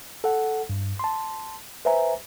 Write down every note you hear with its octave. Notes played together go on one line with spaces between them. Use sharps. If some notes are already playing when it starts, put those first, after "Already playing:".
A4 F#5
G2
A5 C6
B4 C5 E5 G#5 A#5